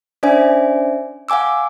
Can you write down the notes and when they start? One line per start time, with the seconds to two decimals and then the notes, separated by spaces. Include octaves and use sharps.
0.23 C#4 D4 C5 D5 E5 G#5
1.29 F5 F#5 G#5 D6 E6